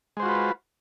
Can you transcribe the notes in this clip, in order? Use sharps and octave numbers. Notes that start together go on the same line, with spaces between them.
G#3 F4 F#4 B4 C5